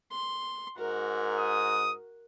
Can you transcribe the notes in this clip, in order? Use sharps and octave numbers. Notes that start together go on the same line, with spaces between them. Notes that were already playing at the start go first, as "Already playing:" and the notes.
C6
G#2 F#4 A#4
D#6